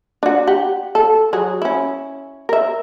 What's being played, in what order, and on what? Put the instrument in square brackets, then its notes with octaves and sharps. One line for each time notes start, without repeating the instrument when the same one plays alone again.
[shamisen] D4 F#4
G4 F#5
A4
F#3 G#4
C#4 E4
A#4 E5